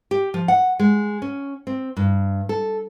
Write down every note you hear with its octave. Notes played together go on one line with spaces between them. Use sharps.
G4
F3
F#5
G#3
C#4
C4
G2
A4